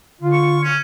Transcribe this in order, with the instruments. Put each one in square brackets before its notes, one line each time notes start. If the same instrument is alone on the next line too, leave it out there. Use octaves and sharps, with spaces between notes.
[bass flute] D3 [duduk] F4
[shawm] C#6
C#4